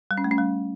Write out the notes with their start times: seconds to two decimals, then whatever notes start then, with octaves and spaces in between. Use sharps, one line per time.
0.11 G3
0.18 C#4
0.24 A3
0.31 C#4
0.38 G3